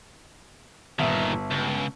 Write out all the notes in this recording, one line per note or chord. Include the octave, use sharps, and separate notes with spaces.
G1 A#2 D#3 E5
C#2